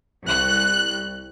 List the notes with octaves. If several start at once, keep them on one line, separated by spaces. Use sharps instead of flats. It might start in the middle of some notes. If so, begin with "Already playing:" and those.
C2 F#6